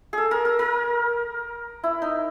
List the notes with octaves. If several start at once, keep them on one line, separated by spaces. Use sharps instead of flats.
G#4 A4
A#4
A#4
A#4
E4
D#4